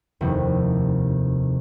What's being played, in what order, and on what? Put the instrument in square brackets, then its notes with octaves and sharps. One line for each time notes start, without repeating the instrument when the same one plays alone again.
[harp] F1 D#2 C3 E4